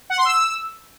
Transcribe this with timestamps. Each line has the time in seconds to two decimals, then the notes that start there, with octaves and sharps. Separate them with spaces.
0.10 F#5
0.18 C6
0.25 E6